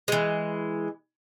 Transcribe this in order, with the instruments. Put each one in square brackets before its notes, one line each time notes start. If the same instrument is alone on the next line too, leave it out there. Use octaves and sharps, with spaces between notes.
[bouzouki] E3 G#3